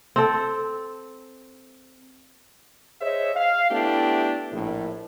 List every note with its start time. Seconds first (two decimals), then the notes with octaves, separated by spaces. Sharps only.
0.16 C4 A4
3.01 G#4 C5 C#5 D#5 E5
3.36 F5
3.71 A3 B3 D4 E4 G4
4.53 A#1 A2